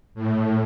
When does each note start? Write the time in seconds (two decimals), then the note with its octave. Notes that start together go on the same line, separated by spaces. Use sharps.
0.15 A2